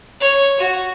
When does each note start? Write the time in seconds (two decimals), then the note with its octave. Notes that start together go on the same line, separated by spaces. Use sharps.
0.21 C#5
0.60 F#4